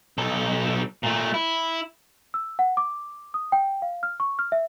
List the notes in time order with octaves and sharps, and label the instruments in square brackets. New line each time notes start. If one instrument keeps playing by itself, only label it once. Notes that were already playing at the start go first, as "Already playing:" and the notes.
[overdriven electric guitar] B1 A4
A#2 A3
E4
[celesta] E6
F#5
D6
D#6
G5
F5
F6
C#6
F6
E5